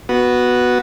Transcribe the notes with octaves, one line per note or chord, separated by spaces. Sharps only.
B3 F#4